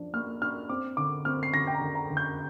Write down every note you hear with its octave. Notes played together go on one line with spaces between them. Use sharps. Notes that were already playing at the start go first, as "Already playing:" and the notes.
Already playing: F3 D4
A#3 F6
D4 F6
C4 D6
D3 D6
C4 F6
C7
D3 A#6
G5
A#5
D3
A#5
D3
G6